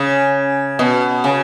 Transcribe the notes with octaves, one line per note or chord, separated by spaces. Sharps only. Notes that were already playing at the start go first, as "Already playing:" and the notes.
Already playing: C#3
B2
C#3